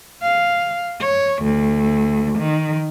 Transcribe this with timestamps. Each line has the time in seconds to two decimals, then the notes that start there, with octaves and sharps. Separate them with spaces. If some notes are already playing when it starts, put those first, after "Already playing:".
0.22 F5
1.01 C#5
1.43 D2
2.38 D#3